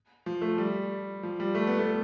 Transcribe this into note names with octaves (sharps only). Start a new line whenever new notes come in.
F3
A3
G3
F3
G3
A3
B3
A3